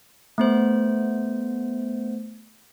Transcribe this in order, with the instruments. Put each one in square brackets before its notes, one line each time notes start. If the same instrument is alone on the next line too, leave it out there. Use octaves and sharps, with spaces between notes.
[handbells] A3 B3 C5